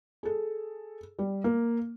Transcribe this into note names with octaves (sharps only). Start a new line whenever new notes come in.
G#4 A4
G3
A#3